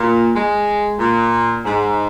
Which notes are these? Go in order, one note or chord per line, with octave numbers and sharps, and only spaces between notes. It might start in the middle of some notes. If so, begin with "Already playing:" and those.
Already playing: A#2
G#3
A#2
G#2